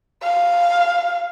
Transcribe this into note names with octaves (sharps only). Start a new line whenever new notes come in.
F5